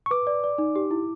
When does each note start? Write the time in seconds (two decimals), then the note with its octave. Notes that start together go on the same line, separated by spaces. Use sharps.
0.06 C#6
0.11 B4 D6
0.27 D5
0.44 D5
0.58 D#4
0.76 G4
0.91 E4